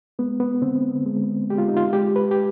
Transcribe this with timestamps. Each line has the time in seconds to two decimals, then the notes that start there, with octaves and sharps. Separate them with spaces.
0.19 G#3 B3
0.40 B3
0.62 D3 C4
1.06 G#3
1.50 G#3 G4
1.58 F4
1.69 D#4
1.77 F4
1.93 G#3 G4
2.16 B4
2.31 G4